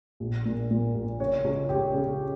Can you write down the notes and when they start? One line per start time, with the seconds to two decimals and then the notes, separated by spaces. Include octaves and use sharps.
0.20 A#1
0.45 A#2
0.71 A#2
0.95 A#1
1.20 C#3 C#5
1.44 C#2
1.69 C#2 G4
1.94 C#3